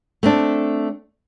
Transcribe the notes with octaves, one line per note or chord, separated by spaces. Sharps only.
A3 C4 D4